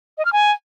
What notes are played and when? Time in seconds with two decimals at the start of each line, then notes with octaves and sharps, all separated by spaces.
0.18 D#5
0.25 F6
0.33 G#5